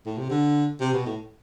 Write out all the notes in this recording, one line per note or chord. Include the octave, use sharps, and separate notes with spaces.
A2
C3
D3
C3
B2
A2